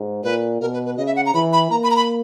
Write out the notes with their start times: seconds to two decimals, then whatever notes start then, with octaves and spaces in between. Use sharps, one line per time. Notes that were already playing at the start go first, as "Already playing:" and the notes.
Already playing: G#2
0.24 A#2 B4
0.61 B2 A#4
0.74 B4
0.86 B4
0.97 C#3 D#5
1.07 E5
1.16 F#5
1.26 A#5
1.34 E3 B5
1.53 B5
1.71 A#3 A#5
1.83 B5
1.91 A#5
1.96 B5